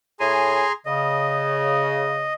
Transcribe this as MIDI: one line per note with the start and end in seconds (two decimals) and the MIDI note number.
0.20 0.63 45
0.20 0.72 68
0.20 0.63 80
0.20 0.72 82
0.20 0.72 84
0.86 2.33 49
0.86 2.33 75